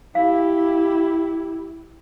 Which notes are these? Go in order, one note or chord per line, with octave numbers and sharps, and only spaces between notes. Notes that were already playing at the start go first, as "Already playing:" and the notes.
E4 G4 F5